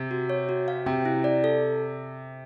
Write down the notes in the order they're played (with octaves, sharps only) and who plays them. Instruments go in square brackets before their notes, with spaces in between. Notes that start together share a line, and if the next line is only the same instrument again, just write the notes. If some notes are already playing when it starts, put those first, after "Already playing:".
Already playing: [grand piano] C3
[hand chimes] F#4
C#5
F#4
F5
[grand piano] C3 [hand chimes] G5
[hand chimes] E4
D5
A4